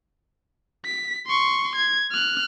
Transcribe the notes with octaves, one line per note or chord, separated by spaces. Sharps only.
B6
C6 C#6
G#6
F6 F#6